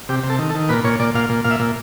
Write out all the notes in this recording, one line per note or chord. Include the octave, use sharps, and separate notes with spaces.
C3 G4
C3
A4
D#3
A4
D#3
A#2 B4
A#2 C#5
A#2 D5
A#2 F5
A#2
A#2 F5
E5
A#2